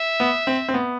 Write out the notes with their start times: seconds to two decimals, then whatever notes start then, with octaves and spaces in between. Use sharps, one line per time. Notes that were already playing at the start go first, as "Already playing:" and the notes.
Already playing: E5
0.20 B3
0.47 C4
0.68 C4
0.74 B3